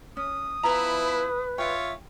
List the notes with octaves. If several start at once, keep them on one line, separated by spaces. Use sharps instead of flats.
C#4 D#6
F3 B3 E4 B4 A#5
F4 C#5 E5 G5